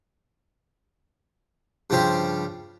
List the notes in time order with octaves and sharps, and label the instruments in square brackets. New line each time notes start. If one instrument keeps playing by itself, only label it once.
[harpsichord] G2 C#3 F3 C4 G4 G5